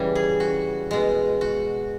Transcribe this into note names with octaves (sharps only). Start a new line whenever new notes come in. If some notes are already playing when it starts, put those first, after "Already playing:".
Already playing: C#3 E3 G3
G#4
F#4
B2 G#3
F#4